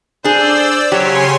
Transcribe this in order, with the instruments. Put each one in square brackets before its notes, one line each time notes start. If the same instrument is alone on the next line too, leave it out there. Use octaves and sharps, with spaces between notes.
[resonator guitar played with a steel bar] D4 G#4 [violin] C5 [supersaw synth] D5 E6
[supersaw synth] C#3 G#5 C6 [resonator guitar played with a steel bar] F#3 G4 [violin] C#5